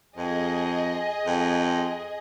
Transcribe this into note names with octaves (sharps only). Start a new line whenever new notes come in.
F2 G#4 D#5
F2